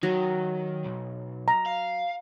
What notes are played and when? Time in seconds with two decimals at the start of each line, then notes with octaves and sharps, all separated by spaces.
0.03 D#3 F#3
0.85 B1
1.48 A#5
1.66 F5